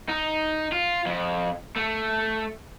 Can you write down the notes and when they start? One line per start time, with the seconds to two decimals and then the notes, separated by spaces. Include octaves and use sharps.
0.09 D#4
0.72 F4
1.06 F2
1.76 A3